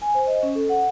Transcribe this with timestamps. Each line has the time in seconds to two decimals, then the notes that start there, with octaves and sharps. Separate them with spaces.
0.02 G#5
0.15 C5
0.27 D#5
0.43 C#4
0.55 A4
0.69 F#5